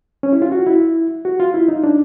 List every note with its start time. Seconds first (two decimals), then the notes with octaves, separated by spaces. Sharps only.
0.23 C#4
0.33 E4
0.42 F4
0.52 F#4
0.67 E4
1.25 F#4
1.40 F4
1.54 E4
1.68 D#4
1.84 D4